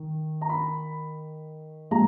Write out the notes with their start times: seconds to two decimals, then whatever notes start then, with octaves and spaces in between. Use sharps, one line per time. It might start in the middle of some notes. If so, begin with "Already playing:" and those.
Already playing: D#3
0.41 A#5
0.49 B5
1.91 A#2 F3 G#3 A#5